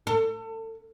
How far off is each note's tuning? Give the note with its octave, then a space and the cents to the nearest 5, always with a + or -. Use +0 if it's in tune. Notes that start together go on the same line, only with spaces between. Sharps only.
A4 +30